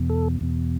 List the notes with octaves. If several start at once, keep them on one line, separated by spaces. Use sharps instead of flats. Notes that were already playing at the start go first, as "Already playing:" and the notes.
Already playing: E2 B2
A4
E2 B2